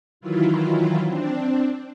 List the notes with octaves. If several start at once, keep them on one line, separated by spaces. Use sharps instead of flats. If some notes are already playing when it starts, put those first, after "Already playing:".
D#3 E3 F#3 E4 F4
C4 D4